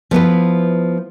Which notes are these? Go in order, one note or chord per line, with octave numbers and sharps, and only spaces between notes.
F3 B3 E4 B4